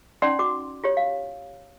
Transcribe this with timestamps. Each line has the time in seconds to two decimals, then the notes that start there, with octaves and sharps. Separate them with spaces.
0.22 C#4 D#4 D5 F#5 C6
0.39 F#4 D6
0.84 F4 G4 C#5
0.97 F5